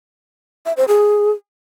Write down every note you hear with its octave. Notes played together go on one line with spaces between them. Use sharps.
E5
C5
G#4